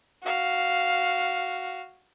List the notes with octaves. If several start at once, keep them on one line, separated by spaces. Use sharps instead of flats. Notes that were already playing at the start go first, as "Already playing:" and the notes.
F#4 F5